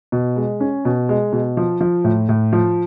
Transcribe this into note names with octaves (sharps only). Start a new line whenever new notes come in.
B2
G#3
C#4
B2
G#3
B2
F3
F3
A2
A2
F3